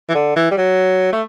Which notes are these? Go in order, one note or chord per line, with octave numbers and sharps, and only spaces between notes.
E3
D3
E3
G3
F#3
A3